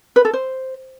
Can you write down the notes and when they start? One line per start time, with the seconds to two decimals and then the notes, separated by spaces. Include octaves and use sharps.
0.16 B4
0.25 A4
0.33 C5